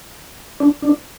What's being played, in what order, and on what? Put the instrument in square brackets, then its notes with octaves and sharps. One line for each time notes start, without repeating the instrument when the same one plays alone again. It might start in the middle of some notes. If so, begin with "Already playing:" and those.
[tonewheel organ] D4
D4